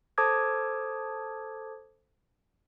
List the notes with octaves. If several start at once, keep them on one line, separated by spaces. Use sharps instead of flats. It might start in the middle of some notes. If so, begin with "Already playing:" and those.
A4 C5 A5 D6 D#6 G#6